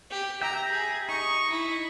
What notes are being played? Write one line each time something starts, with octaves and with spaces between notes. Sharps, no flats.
G4
G4 E5 G5 A#5
G#4
D#4 C#6
E4